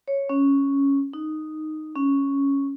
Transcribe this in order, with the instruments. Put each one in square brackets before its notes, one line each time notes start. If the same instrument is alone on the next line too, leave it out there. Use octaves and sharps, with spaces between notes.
[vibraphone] C#5
C#4
D#4
C#4